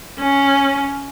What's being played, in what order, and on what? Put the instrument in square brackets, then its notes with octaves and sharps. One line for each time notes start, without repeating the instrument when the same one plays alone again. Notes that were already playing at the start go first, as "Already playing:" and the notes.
[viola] C#4